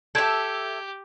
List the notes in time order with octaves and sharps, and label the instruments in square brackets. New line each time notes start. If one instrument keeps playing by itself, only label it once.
[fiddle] G4 [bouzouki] A4 E5 [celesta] G6 G#6 D7